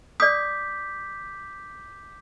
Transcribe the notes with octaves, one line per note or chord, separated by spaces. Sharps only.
D5 D6 D#6 G6 B6